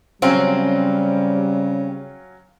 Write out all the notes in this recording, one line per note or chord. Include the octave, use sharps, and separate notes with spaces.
C#3 F#3 G3 C4 C#4 F4